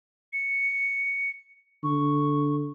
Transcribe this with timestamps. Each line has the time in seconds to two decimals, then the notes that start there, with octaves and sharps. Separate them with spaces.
0.33 C#7
1.84 D3 C#6